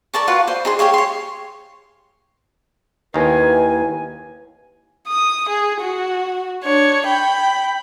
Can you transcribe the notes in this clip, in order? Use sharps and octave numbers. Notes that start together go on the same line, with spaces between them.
A#4 D5 A5 C#6
F4 F#4 B4 F5
C5 D5
D#4 G#4 C6
G4 G#4 C#5 F5
C#5 C6
D#2 D#3 E4 B4 D#5 F5 G#5
D#6
G#4
F#4
D4 C#5
G5 B5